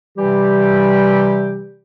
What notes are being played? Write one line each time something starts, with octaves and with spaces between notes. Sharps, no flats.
C3 E3 G3 G4